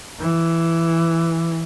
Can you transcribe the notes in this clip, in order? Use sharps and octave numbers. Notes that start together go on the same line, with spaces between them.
E3